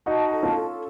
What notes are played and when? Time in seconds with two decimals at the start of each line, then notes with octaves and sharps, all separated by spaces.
0.06 D#4 F#4 A5
0.31 A4
0.43 C#4 F4
0.55 A4